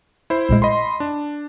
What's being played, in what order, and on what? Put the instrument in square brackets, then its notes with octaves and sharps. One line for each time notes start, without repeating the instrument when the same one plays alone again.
[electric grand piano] E4 C5
[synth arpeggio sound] B1 A#2 G#3
[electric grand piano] D#5 B5 C6
D4